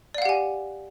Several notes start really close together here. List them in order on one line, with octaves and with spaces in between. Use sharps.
D5 F5 F#5 G4 G#5